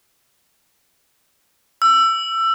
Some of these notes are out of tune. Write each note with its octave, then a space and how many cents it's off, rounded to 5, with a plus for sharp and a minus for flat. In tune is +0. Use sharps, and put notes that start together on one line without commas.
E6 +20